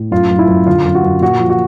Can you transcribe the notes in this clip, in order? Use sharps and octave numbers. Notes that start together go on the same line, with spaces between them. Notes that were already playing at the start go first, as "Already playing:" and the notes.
Already playing: A2
F#2 F4
F#2
E4
F#2
D3 F4
F#2
F#4
F#2
A#2 F#4
F3
F#4